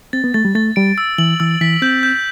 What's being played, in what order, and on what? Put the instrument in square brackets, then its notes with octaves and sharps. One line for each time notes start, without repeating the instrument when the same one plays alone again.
[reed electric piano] C4 [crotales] A6
[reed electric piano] B3
[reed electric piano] A3 [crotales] A6
[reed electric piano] G3
[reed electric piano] A3 [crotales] A6
[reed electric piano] G3 [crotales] D7
[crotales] E6
[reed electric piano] E3 [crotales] F#7
[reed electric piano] E3 [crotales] E6
[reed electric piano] E3 [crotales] B6
[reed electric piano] C4 [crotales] G6
[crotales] G6